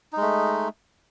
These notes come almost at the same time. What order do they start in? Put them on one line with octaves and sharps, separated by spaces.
D#4 G#3 A3